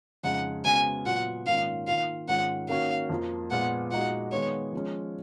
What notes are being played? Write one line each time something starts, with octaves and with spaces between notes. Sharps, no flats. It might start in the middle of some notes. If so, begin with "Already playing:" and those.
F2 C#3 G#3 D#4 F#5
C#3 G#3 B3 F#4 G#5
A#2 F#3 B3 F4 F#5
G#2 D#3 A#3 C#4 F4 F5
D#3 A#3 F4 F5
G#2 D#3 G#3 C#4 F4 F#5
D#3 A#3 C#4 F#4 F5
F2 F3 A#3
A#2 G#3 B3 F4 F#5
A#2 G#3 D#4 F#4 F#5
D#3 G#3 B3 C#5
F3 G#3 C#4